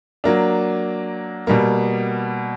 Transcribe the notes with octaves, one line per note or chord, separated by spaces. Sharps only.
F#3 A#3 D4
B2 G3 A#3